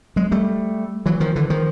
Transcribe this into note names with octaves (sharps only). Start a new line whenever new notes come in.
F#3 G#3
G3 A3
E3 F#3
D#3 F3
D3 E3
D#3 F3